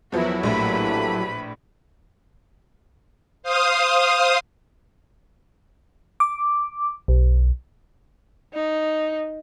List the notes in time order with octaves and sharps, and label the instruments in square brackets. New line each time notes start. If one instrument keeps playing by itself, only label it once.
[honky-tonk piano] E2 F3 B3 [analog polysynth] F#3 E4 [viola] F#4 A#4
[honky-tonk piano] A#1 A2 [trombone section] A#3 G4 A4 [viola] B4 B5
[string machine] C5 F5 D#6
[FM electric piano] D6
B1
[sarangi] D#4